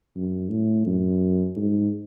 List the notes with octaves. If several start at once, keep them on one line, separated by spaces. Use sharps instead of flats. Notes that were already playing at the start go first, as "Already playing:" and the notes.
F#2
A2
F#2
G#2